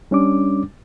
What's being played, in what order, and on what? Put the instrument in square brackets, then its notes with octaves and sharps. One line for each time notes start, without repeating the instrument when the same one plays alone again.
[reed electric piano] G3 C#4 D4 D6